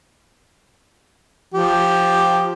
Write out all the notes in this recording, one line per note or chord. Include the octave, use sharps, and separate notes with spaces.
F3 G4